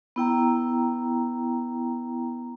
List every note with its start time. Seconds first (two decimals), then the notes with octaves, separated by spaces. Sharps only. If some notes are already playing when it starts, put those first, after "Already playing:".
0.16 B3 E4 G5 A#5